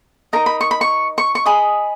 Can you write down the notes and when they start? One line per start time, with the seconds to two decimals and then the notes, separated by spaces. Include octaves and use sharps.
0.33 D#4 A#4 D#5 A#5
0.46 B5
0.61 C#6
0.71 B5
0.81 C#6
1.18 C#6
1.35 C#6
1.46 G#4 D#5 B5